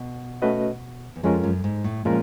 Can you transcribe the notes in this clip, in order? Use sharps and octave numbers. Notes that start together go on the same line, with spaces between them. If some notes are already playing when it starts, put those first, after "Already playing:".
Already playing: B2
A3 C#4 F#4 B4 D#5
E2
F2 F3 G#3 C#4 F4 A#4
F#2
G#2
A2
A#2 F3 G#3 C#4 F4 A#4